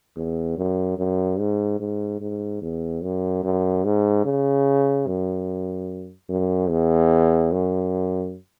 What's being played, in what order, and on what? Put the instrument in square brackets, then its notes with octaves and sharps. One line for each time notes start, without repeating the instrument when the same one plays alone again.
[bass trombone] E2
F#2
F#2
G#2
G#2
G#2
E2
F#2
F#2
G#2
C#3
F#2
F#2
E2
F#2